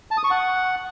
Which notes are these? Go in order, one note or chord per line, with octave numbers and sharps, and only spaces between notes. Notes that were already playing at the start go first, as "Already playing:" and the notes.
A5
D#6
C#6
F#5